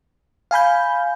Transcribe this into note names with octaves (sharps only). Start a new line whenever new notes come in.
F5 G#5 B5 G6